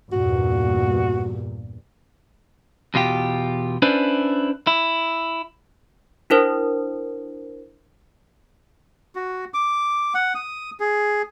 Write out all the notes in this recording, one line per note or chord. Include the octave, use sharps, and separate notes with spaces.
E2 G2 A#2 F#4
E2 B2 F4 G4
C#4 D4 E4 B4 C5 D5
E4
D4 E4 A#4 C5
F#4
D6
F#5
D#6
G#4